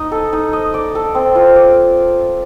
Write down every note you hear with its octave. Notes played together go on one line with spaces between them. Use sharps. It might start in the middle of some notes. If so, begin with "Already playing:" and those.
Already playing: D#4 D#5
A4
D#4
D#5
D5
A4
C4
F4
D5